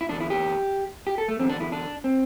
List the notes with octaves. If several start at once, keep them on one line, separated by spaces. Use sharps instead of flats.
E4
E2 D3 D4
E4
G4
G4
A4
A3
E2 D3 C4
D4
E4
D4
C4